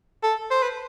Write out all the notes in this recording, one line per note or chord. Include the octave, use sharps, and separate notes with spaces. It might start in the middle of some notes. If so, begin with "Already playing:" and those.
A4
C5
B4